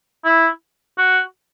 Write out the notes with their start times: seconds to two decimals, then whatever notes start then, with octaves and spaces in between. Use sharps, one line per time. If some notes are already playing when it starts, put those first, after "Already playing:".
0.25 E4
0.98 F#4